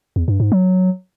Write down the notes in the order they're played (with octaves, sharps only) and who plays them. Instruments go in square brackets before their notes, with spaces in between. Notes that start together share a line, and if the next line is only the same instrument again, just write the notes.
[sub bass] E2
G2
G#2
F#3